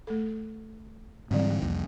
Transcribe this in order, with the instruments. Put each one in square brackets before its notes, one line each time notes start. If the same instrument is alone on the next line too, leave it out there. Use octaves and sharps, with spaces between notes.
[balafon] A3 A4
[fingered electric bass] G#2 D3 E3 [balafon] G3 C4 D5
[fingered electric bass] C2 F2 [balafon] A#3